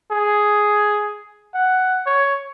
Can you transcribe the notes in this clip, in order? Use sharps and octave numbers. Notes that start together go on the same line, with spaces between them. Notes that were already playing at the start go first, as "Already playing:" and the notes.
G#4
F#5
C#5